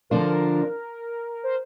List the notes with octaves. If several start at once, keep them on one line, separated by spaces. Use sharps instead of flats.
D3 F3 D4 F4 A#4 C5
C5